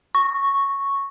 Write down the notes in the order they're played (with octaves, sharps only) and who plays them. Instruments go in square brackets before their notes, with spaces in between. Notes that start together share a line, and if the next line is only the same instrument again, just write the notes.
[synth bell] C#6